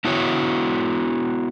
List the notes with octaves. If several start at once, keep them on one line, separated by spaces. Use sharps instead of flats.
B3 E4 F#4 C#5